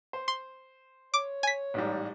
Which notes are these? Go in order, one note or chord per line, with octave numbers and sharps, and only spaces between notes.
C5
C6
C#5 D6
G#5 B6
A1 G#2 G3